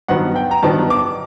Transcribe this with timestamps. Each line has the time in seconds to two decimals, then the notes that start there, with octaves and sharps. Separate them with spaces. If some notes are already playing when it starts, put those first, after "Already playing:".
0.08 G2 D#3 F#3 B3 F#5
0.36 G5
0.51 A#5
0.63 G2 D#3 F#3 B3 A5
0.90 D6